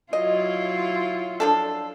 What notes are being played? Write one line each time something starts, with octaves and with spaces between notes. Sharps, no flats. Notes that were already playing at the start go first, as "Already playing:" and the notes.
F#3 E4 F4 D#5
F3 D4 A4